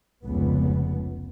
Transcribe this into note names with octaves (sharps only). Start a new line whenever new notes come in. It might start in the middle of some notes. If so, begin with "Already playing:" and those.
F1 C#2 B3